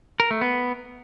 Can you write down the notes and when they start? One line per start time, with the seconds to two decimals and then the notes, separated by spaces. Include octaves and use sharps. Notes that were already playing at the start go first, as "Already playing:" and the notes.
0.20 A#4
0.31 A3
0.41 B3